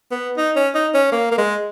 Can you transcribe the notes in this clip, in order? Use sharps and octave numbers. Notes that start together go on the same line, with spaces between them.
B3
D#4
C#4
D#4
C#4
A#3
A#3
G#3